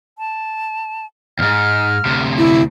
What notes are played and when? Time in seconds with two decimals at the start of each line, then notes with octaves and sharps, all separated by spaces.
0.18 A5
1.39 D#2 G#2 F6
2.06 D2 C3
2.38 E4